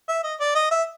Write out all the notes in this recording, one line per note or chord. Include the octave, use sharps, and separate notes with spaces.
E5
D#5
D5
D#5
E5